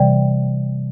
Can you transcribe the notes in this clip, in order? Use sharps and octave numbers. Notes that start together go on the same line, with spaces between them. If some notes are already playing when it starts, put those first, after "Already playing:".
Already playing: C3 E3 G3 D5 G5